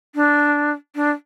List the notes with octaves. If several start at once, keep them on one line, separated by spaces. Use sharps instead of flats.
D4
D4